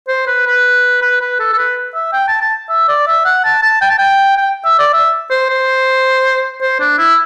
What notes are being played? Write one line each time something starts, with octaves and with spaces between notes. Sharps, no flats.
C5
B4
B4
B4
B4
A4
A4
B4
E5
G5
A5
A5
E5
D5
E5
F#5
A5
A5
G5
A5
G5
G5
E5
D5
E5
C5
C5
C5
D4
E4